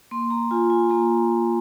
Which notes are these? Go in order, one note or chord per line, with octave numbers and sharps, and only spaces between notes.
A#3 C6
A#5
F4 G#5
G#5
A#3 A#5